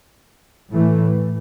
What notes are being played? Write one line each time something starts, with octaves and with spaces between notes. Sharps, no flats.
A2 E3 A3